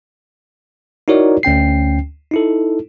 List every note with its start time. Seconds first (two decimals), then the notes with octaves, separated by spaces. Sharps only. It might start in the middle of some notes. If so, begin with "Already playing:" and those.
1.08 D#4 E4 F#4 A#4 C#5 D5
1.43 D2 C#4 G5 C7
2.31 D#4 E4 A4